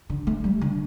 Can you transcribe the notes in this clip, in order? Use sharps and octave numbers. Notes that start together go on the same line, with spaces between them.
D3
A3
G3
D3